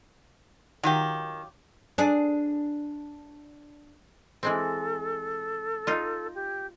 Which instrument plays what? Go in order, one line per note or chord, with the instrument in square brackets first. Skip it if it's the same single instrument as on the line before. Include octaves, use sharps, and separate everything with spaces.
[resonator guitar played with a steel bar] D#3 [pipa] F#3 F4 G4
[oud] D4 G#4
[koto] E3 G#3 C4 [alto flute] A4
[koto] D#4 F4
[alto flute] G4